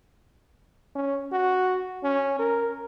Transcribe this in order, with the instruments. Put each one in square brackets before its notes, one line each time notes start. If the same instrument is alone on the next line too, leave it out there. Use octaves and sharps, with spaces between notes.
[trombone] C#4
F#4
C#4
A#4